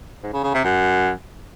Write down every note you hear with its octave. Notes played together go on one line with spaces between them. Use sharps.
G#2
C#3
C#3
C3
F#2